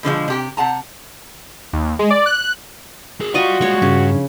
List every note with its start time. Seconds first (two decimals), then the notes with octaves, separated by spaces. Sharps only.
0.03 B2 D3 F3 G#3
0.28 C3 G4 G5
0.57 C3 F#5 A5 A#5
1.73 D#2
1.99 G#3
2.10 D5
2.26 F#6
3.20 G#4 A#4
3.34 F4 F#4 D5 D#5 G5 C#6
3.61 G3 G#3 C#5 C#6
3.82 G2 C#3